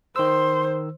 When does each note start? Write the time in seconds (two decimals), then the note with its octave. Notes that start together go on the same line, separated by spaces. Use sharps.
0.16 D#3 C5 C6 E6